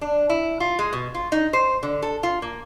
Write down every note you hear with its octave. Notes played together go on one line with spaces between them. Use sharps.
D4
E4
F4
G#3
B2
F4
D#4
C5
D3
A4
F4
A#3